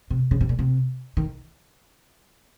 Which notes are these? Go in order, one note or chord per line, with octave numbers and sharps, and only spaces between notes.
C3
C#3
C3
A#2
C3
D#3